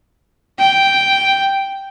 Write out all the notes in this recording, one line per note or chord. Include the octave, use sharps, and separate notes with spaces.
G5